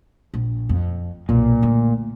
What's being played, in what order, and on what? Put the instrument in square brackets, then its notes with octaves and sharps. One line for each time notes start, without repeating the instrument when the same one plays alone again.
[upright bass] A#1
F2
[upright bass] B1 F2 [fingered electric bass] A#2
[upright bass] D3 A3